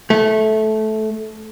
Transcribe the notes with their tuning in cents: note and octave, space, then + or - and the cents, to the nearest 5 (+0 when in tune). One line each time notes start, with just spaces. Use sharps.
A3 -15